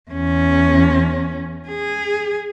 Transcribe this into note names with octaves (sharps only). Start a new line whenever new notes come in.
E2 C#4
G#4